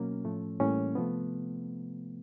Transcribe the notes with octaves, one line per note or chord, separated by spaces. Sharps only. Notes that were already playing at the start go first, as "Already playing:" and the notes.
Already playing: B2 F#3 A#3 C#4
A2 F3 A3
A2 E3 G3 A#3 C#4
C3 F3 A3 B3